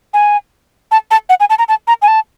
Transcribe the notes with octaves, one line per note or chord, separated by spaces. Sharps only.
G#5
A5
A5
F#5
G#5
A5
A#5
A5
A#5
G#5
A5